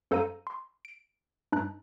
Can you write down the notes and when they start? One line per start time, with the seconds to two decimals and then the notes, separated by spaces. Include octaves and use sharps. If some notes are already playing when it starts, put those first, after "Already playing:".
0.11 F#2 A4 C5 F5 A#5 D#7
0.47 C6
0.85 D7
1.52 G2 D#4 A5 F#6